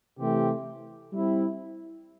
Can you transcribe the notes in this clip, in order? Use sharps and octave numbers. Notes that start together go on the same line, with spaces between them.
C3 E3 A3 C4 G4
G3 C4 E4